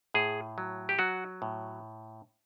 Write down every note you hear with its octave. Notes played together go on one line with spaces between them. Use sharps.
A2 G#4
F#3
G4
F#3 F#4
A2